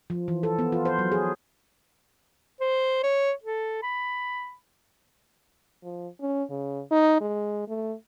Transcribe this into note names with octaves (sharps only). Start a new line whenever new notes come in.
F3
E3
A4
B3
F4
C5
F#3
G#4
C5
C#5
A4
B5
F3
C#4
C#3
D#4
G#3
A3